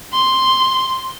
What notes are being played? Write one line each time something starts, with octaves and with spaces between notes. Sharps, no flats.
C6